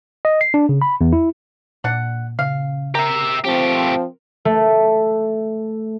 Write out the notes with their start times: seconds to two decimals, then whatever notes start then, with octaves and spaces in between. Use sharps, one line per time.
0.25 D#5
0.41 C7
0.54 D4
0.69 C#3
0.82 B5
1.01 E2
1.13 E4
1.84 A#2 D4 F#5
2.39 C#3 F5
2.95 G4 A#4 E5 A#5
3.44 F3 A3 C4 G4
4.45 A3